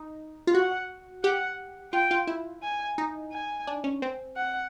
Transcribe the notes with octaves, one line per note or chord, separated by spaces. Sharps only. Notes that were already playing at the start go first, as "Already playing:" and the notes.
Already playing: D#4
F4
F#4 F#5
G4 F#5
F4 G5
F4
E4
G#5
D#4
G#5
D4
C#4
C4
F#5